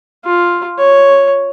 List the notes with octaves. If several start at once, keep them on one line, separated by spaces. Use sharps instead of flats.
F4
C#5